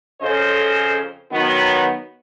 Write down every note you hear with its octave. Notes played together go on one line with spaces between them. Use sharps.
F2 C#3 C#4 A4 C5 D#5
D#3 F#3 B3